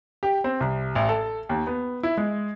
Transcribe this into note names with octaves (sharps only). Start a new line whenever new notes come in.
G4
C4
C2
A1
A4
D#2
B3
E4
G#3